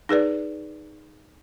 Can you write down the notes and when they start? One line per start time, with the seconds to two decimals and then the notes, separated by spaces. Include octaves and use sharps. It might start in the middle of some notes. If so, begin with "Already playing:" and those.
0.09 D#4 G#4 B4 D5